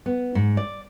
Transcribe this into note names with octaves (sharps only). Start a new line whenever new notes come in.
B3
G#2
D5